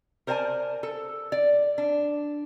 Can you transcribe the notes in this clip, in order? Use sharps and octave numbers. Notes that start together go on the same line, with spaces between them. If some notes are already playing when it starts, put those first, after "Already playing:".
A#4 C5 D5 F#5 G#5 A5
A4
D5
D4